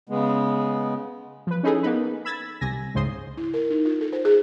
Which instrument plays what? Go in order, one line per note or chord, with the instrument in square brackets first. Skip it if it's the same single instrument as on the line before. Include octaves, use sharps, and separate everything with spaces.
[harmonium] C#3 G#3 B3
[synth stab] F3 B4
C#4 D#4 E4 G#4 A4
A#3 B3 D#4 B4
B5 E6 G#6 A6 B6
C2 C3 G#5 A#6
C#2 G#2 C#3 C5 C6 D#6
[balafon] E4
A#4
D#4
F4
A4
C5
G#4